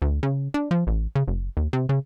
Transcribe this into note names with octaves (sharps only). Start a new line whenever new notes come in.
D2
C#3
D4
F3
A1
C#3
F#1
D#2
C3
C#3